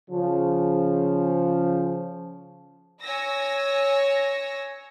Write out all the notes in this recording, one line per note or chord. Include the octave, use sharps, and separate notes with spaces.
C#3 F3
C#5 G#5 E6 A#6